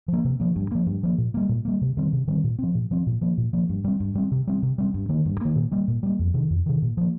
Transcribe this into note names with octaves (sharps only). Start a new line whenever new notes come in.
F3 A#3
C3
F3 A#3
G2
F3 A#3
G2
F3 A#3
A#2
G3 A#3
A#2
G3 A#3
C3
D#3 G3 C4
C3
D#3 G3 C4
A#2
F3 C4
A#2
F3 C4
A#2
F3 A#3
A#2
F3 A#3
G2
G3 C4
G2
G3 C4
C3
G3 C4
C3
G3 C4
G2
D#3 A#3
G2
D#3 A#3
A#2
G3 A#3
A#2
G3 A#3
F2
C3 D#3
F2
C3 D#3
A#2
F3 A#3